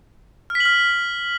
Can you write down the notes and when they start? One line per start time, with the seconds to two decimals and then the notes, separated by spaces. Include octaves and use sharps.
0.50 F6
0.55 B6
0.60 F#7
0.65 F6